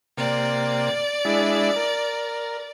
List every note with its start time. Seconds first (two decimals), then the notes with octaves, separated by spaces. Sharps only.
0.18 C3 A#3 D5
1.25 G#3 D4 E4
1.76 A#4